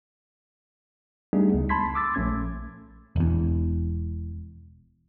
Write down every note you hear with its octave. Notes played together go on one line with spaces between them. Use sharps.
G3 A3 B3 D4 D#4 G#4
C#2
A5 B5 C6 G#6 B6
C6 D6 E6 A6
A#1 A3 C#4 G#6
E1 E2